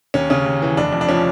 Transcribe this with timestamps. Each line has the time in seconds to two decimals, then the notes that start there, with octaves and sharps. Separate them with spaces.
0.14 D#2 C#4
0.30 C#3 C#4
0.46 D#2
0.62 E3
0.77 F1 D4
0.93 F2
1.01 D4
1.09 F3 C#4